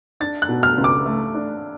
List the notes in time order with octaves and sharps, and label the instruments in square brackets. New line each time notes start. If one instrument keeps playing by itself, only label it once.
[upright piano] D4 [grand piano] A6
[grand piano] F#6
[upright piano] B2
[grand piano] F6
[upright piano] C#2
[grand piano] D6
[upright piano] A3
D4